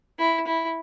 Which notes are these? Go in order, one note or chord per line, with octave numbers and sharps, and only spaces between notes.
E4
E4